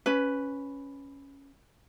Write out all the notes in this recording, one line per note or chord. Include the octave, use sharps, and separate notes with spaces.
C#4 B4